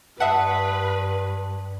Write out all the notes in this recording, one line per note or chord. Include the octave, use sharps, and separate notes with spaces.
G2 B4 E5 F#5 A5 D#6 C7